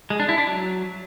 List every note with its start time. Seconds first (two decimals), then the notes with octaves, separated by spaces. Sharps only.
0.10 G#3
0.20 D4
0.29 E4
0.38 D4
0.47 F#3